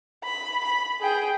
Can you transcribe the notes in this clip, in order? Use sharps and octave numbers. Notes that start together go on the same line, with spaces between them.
B5
B5
G#4 G5